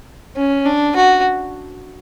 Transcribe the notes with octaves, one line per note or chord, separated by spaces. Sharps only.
C#4
D4
F#4